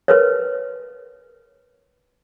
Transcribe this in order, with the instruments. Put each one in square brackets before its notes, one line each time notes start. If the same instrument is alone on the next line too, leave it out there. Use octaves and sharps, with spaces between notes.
[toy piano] A#4 B4 C#5